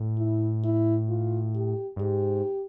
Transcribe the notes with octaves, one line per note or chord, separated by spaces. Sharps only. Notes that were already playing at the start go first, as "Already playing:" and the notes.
Already playing: A2
E4
E4
F4
G4
G2
G#2 G4